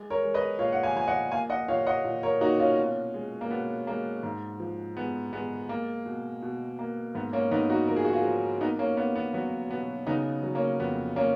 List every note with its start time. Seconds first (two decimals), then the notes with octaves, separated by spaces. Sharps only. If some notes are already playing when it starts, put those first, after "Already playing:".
Already playing: G#3
0.10 A#4 C#5
0.23 G#3
0.34 B4 D#5
0.59 A#2 C#5 F5
0.73 F#5
0.83 F5 G#5
0.96 F3 G#5
1.08 D#5 F#5
1.32 A#3 F5 G#5
1.50 D#5 F#5
1.68 A#2 C#5 F5
1.86 D#5 F#5
2.05 A#2
2.23 A#4 C#5
2.41 A#3 D#4 F#4
2.59 C#4 F4
2.78 B2
3.14 G#3
3.41 A#3
3.50 B2 B3
3.87 G#3 A#3
4.23 G#2
4.60 F3
4.96 G#3 B3
5.33 G#3 B3
5.69 A#3
6.06 B2
6.42 B2
6.79 A#3
7.15 G#2 B3
7.33 A#3 C#4
7.51 G#2 B3 D#4
7.70 D#4 F#4
7.88 F3 A#4
7.96 G#4
8.05 F#4
8.13 F4 G#4
8.25 F3
8.61 A#3 B3 D#4
8.79 A#3 C#4
8.97 A#3 B3
9.16 B3
9.34 F#3 B3
9.70 B2 B3
10.07 C#3 B3 D#4
10.43 F#3
10.55 A#3 C#4
10.80 F2 B3
11.16 A#3 C#4